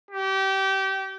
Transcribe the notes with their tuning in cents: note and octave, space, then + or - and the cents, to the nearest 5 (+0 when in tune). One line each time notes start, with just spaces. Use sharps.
G4 -25